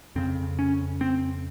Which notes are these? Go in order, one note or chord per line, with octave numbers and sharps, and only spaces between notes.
F2 C#3 C4
C#4
C4